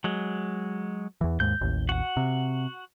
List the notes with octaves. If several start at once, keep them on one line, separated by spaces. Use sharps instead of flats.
F#3 G#3
E2 E3
D#2 G#2 G6
A1 D#2
F#4 F#5
C3